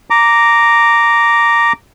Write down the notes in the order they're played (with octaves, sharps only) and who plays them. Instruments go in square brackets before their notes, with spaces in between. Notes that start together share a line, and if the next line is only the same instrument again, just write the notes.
[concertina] A#5 D6